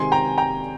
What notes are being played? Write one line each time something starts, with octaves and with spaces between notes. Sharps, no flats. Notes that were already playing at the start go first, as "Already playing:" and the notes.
Already playing: C3 D#3 G#3 C4 G#5 C6
G5 A#5
G5 A#5